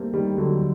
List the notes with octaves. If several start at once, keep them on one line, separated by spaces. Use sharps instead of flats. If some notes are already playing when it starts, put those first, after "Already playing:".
Already playing: G3 A3 A#3 C4
D#3 G3
D3 F#3